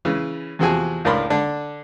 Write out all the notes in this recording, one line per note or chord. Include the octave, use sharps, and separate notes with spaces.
C#3 E3
E2 C3 F3 F#4 G#4 G#5
C#2 A2 D4 A#4 B5 C6
D3 D4